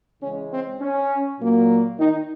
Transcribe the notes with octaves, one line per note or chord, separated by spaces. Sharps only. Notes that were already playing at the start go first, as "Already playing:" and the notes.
C#3 E3 G#3 C#4
C4
C#4
A#2 F#3 A#3
D#3 D#4